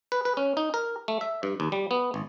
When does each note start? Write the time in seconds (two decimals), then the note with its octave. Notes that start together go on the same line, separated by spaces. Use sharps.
0.12 B4
0.25 B4
0.37 C#4
0.57 D#4
0.74 A#4
1.08 A3
1.21 E5
1.43 G2
1.60 D#2
1.72 G3
1.91 B3
2.14 G#1